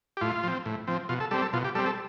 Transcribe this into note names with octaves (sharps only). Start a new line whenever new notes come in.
G4
A2 F4
F3 C4
A2
F3 C4
B2 F4
A4
G3 C4 A4
A4
B2 F4
G4
G3 C4 A4
A4